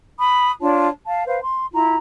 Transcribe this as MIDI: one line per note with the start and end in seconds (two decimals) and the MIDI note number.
0.18 0.50 83
0.18 0.50 87
0.61 0.89 62
0.61 0.89 65
0.61 0.89 73
0.61 0.89 81
1.06 1.22 77
1.06 1.22 81
1.26 1.39 71
1.26 1.39 72
1.26 1.39 77
1.41 1.65 84
1.73 1.97 64
1.73 1.97 65
1.73 1.97 82